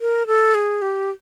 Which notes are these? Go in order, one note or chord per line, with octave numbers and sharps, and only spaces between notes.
A#4
A4
G#4
G4